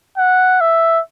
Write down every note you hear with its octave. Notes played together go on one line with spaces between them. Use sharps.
F#5
E5